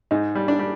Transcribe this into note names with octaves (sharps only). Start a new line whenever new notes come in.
G#2 D#4
G3
D4
G3